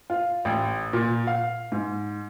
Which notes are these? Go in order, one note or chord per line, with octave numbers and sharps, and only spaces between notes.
F4
A1
A#2
F5
G#2